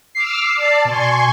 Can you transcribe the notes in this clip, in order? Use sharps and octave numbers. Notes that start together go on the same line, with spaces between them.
D6 E6 F6 C7
D5 A5 A6
B2 G#5 C6 C#6